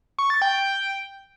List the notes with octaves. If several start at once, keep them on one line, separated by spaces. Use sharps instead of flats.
C#6
A6
G5